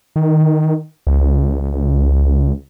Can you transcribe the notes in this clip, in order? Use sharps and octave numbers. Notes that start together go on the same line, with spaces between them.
D#3
C#2